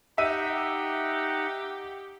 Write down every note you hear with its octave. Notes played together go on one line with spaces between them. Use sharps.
D#4 G4 E5 F#5 D#7